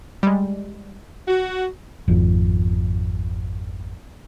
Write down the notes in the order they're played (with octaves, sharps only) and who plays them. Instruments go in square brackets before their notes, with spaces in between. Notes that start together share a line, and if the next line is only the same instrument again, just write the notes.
[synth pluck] G3 G#3
[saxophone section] F#4
[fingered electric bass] G#1 F2